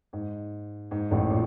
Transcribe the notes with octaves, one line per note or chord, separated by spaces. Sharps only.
G#2
G#2
A1 A2
A#2